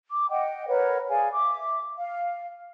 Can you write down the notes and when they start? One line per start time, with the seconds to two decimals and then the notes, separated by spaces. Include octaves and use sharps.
0.11 D6
0.30 D#5 F#5 G5
0.67 A#4 B4 C#5 F#5
1.08 G#4 D5 F5 G#5
1.33 E5 D6
1.97 F5